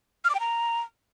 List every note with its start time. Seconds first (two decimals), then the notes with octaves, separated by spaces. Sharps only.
0.24 F6
0.30 D6
0.35 G5
0.40 A#5